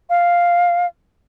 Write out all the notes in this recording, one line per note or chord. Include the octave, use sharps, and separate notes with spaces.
F5